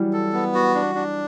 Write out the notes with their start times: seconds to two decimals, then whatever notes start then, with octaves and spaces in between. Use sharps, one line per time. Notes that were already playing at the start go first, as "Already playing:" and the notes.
Already playing: E3 F#3 G3
0.13 A4
0.33 B3
0.55 F#4
0.75 D4
0.95 D4